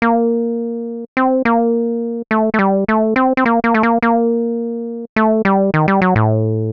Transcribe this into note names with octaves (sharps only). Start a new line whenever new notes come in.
A#3
C4
A#3
A3
A3
G3
A3
C4
C4
A#3
A#3
A3
A#3
A#3
A3
G3
D#3
G3
F#3
A2